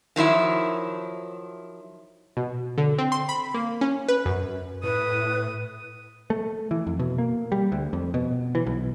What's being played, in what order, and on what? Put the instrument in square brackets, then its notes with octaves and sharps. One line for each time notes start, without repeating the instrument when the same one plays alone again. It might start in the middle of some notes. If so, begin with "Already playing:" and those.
[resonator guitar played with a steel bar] D#3 F3 F#3 E4
[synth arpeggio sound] B2
D3
C4
C6
B5
A#3
C#4
B4
F#2
[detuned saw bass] A2 [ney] B4 [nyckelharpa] D#6
[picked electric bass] A3
E3
F2
B2
A#3
G3
D2
F2
B2
E3
B1